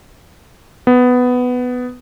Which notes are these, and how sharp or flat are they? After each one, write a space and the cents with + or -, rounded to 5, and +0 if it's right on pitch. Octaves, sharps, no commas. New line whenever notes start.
B3 +10